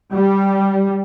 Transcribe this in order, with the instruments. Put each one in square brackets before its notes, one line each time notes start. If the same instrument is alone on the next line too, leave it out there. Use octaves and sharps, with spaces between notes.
[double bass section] G3